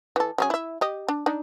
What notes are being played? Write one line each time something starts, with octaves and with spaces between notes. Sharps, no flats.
E3 A4
F#3 C#4 G#4
E4 E5
G4 D#5
D4
D4 D#4